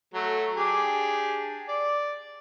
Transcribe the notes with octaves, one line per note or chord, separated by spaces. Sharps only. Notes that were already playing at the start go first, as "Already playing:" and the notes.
F#3 A3
D4 G4 G#4
D5